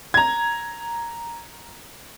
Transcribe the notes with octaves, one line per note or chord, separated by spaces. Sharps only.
A#5 G#6